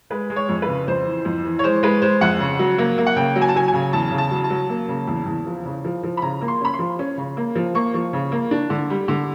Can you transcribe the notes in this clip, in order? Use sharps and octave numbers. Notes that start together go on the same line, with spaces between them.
G#3 B4
G#3
C#5
F2
B4
C#3
F2 C5
E3
F2
E3
C#5
G#3 C5
G#3 B4
G#3 C5
F2 F#5
C#3
F#3
A#3
A#3
F#5
C#3 G5
F#3
G#5
A5
F#3 G#5
G#5
C#3
E2 A5
C#3
A5
F#3
A5
F#3
A#3
C#3
E2
E2
F3
C#3
F3
F3
B5
C#3 A#5
A#3
C6
C#4 B5
C6
F3
C#4
C#3
A#3
F3
A#3 C#6
F3
C#3
A#3
D4
D3
G3
D3